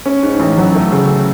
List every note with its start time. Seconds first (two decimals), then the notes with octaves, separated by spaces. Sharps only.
0.06 C#4
0.23 G#2
0.39 A1
0.57 F#3
0.75 A3
0.92 C#3